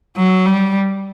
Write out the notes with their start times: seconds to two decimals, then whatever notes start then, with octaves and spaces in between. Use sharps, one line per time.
0.17 F#3
0.46 G3